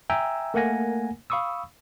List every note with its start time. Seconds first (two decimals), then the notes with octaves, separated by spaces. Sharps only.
0.10 E5 G5 G#5 A#5 E6
0.54 A3 A#3 A#4 F#5 G#5 A#6
1.30 F5 B5 C#6 D#6 E6